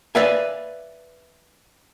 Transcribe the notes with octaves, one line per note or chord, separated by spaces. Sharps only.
B4 D5 E5 F5 G#5